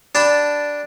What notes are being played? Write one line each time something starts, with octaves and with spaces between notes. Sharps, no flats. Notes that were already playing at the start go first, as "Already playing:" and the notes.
D4 G4 A5 B5